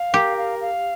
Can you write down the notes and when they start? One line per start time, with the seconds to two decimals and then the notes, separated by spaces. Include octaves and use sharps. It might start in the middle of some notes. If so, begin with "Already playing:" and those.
Already playing: F5
0.14 G4 A#4
0.36 F5
0.59 F5